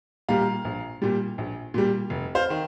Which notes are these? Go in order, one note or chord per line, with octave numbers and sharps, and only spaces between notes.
A#2 G3 F5 A#5
A#1
A#2 G3
A#1
A#2 G3
F1
C5 F5
D#3